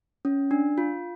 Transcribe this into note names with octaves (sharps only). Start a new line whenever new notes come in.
C#4
D4
F4